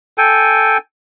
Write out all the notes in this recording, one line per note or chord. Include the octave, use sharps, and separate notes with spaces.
A4 G5 G#5